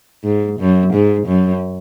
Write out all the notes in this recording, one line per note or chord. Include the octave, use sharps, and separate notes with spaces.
G#2
F#2
G#2
F#2